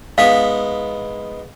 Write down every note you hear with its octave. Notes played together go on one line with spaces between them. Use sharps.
G#2 B3 F5